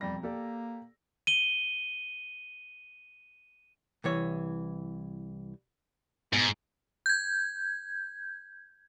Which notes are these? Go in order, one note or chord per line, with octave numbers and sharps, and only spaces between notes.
E1 F2 G3 A#6
A#3 G4 A4 D5
D#7 G7
C2 E3 C#5
G#2 B2
G6 G#6